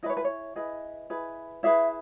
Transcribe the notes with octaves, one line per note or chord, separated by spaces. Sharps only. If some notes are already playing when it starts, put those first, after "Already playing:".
E4 G#4 B4 D#5
C#5
B4
C#5
E4 G#4 B4 D#5
E4 G#4 B4
E4 G#4 B4 E5